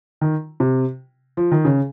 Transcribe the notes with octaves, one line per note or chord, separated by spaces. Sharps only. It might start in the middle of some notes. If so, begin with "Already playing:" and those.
D#3
C3
F3
D#3
C#3